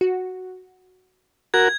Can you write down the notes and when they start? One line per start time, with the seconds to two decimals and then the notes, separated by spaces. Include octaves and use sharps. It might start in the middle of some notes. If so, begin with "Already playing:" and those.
0.01 F#4
1.54 F#4 A#4 G#6